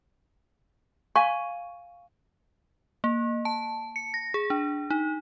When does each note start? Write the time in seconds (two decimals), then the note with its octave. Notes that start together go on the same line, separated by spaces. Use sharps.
1.15 F5 G#5 C#6
3.04 A#3
3.45 A5
3.96 C#7
4.14 A#6
4.34 G#4
4.50 D4
4.90 D#4